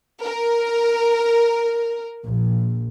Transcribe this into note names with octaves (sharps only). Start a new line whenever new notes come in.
A#4
A#1